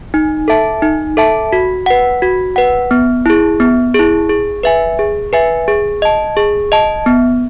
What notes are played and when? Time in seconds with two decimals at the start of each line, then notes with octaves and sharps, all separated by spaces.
0.14 D#4
0.48 A4 E5 A5
0.82 D#4
1.17 A4 E5 A5
1.53 F#4
1.86 B4 F#5
2.22 F#4
2.56 B4 F#5
2.91 B3
3.26 E4 G#4
3.60 B3
3.94 E4 G#4
4.29 G#4
4.63 B4 E5 G#5
4.99 G#4
5.33 B4 E5 G#5
5.68 G#4
6.02 D#5 A5
6.37 G#4
6.72 D#5 A5
7.06 B3